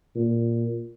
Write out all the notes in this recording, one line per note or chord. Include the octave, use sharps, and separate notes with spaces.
A#2